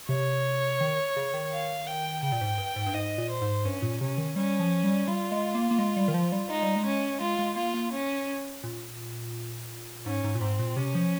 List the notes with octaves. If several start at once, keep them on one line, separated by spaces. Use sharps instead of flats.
C3 C#5
D#3
C#3
D#3
F5
G5
C#3 G5
A#2
G#2
G2
G#2
G2
G#2 D#5
A#2
C5
G#2
G2 C#4
A#2
C3 C#4
D#3
G3 C#4
F3
G3
G3 F4
G#3
A#3
A#3
G#3
G3
D#3
F3
G3
G#3 D#4
G3
G#3
C#4
G#3 F4
G#3
A#3 F4
A#3
C#4
A#2
G#2 C#4
G#2
A#2
G#2 C4
A#2
C3 C#4
F3